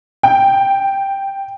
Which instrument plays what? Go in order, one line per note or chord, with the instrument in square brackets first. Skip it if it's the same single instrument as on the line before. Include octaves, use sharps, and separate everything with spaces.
[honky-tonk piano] G5